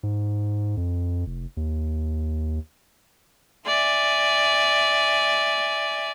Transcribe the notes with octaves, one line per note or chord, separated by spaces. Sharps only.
G#2
F2
F1
D#2
D5 E5 G#5